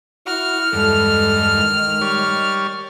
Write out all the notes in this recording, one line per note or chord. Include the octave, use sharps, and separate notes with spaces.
E4 F#4 F6
E2 G2 G#3 A4
D#3
G3 C#5